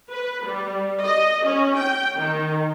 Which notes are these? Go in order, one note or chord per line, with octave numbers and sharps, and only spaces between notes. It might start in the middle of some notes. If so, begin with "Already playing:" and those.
B4
G3
D#5
C#4
G5
D#3